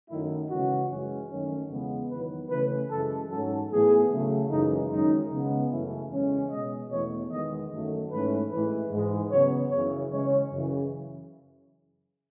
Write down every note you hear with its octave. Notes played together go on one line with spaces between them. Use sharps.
F#2 D#3 F#3 A3 E4
C#3 E3 G#3 C#4 F#4
F#2 E3 G#3 C#4
F#2 D#3 F#3 A3 C#4
E2 C#3 G#3 B3
E2 D#3 F#3 B4
C#3 E3 A3 C#4 B4
F#2 E3 G#3 A4
G#2 F#3 C#4 A4
A2 E3 B3 G#4
C#3 F#3 A3
F#2 C#3 E3 G#3 D#4
F#2 D#3 G#3 C#4 D#4
C#3 G#3 B3
F#2 C#3 E3 A3 C#4 E4
E2 C#3 G#3 C#4
B2 G#3 C#4 D#5
E2 B2 A3 C#5
E2 D#3 G#3 B3 D#5
F#2 D#3 F#3 A3
G#2 E3 A3 C#4 B4
A2 E3 G#3 B4
G#2 E3 G#3
C#3 F#3 B3 C#5
F#2 C#3 E3 C#5
C#3 G#3 C#4 C#5
F#2 C#3 E3